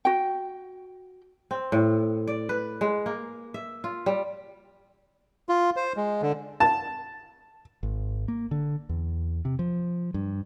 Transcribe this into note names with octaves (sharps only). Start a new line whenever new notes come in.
F#4 G5
C4
A2
D5
B4
G#3
A#3
E5
F4
G3
F4
C5
G#3
D3
A5
G#1
A#3
D3
E2
C3
F3
G2